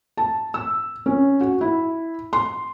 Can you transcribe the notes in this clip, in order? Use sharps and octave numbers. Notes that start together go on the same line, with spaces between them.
A5
E6
C#4
F#4
E4
C6